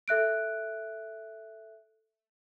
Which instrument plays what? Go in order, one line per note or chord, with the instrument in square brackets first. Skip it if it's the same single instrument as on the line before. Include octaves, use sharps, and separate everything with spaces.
[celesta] A4 E5 F#6 D7